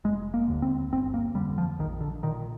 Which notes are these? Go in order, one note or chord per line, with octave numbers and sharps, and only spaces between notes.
F1 G#3
A#3
D#2 D3
C4
G1 C4
A#3
F2 D3 G3
F3
A#1 D#3
D3
A#2 D#3